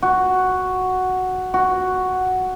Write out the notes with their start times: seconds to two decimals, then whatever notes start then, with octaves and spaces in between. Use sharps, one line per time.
0.02 F#4
1.54 F#4